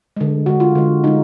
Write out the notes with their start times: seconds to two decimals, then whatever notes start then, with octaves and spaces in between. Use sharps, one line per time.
0.17 D3 G#3
0.46 D3 G#3 F#4
0.60 F4
0.75 D3 G#3
1.04 D3 G#3 D#4